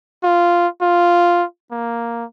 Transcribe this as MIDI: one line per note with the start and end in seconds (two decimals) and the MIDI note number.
0.24 0.67 65
0.81 1.44 65
1.71 2.25 58